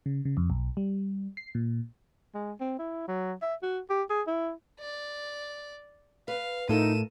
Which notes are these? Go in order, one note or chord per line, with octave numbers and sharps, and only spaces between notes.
C#3
C#3
F2
B1
G3
C7
A#2
G#3
C4
E4
F#3
E5
F#4
G4
G#4
E4
D5
B4 F5
A2 D#4 F4 A4 A#4 D#7 E7